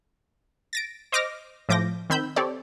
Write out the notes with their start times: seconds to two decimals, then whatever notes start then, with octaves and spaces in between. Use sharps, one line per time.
0.73 A6 A#6 D7
1.12 C5 D#5 D6 F6 A#6
1.69 A2 F3 D6 G6 A#6
2.10 D#3 C4 B5 E6 G6
2.36 C4 G4 A4 C#5 D5